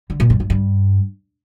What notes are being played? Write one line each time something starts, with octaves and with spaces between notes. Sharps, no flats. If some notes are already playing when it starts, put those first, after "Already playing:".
D3
A#2
G2
G2
G2